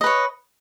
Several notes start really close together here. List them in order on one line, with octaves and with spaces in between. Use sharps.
D#5 B4 C#5